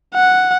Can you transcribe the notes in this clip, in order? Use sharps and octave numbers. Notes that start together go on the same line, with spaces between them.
F#5